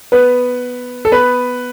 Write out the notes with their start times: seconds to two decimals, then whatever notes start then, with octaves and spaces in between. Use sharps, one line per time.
0.12 B3 B4
1.05 A4
1.12 B3 B4